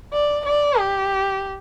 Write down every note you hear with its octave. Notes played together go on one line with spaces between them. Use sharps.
D5
D5
G4